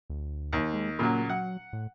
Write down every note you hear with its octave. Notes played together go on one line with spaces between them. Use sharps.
D2
D#2
G#3
A#2 C#3 F#3 A#3
F#3 F#5
A2